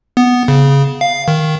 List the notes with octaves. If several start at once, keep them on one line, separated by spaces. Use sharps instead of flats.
B3
C#3
F5
D#3